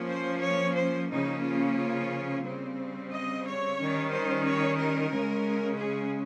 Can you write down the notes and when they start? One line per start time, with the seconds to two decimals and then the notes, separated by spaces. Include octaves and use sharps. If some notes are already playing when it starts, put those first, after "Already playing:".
Already playing: F3 A#3 C#4
0.10 C5
0.43 C#5
0.76 C5
1.10 C#3 F3 A#3 C#4 D#4
1.44 F4
1.77 F4
2.43 C#3 G3 C4
3.11 D#5
3.44 C#5
3.77 D#3 G3 C#4
4.11 C5
4.45 C#5
4.78 A#4
5.11 C#3 G#3 C#4
5.78 G#4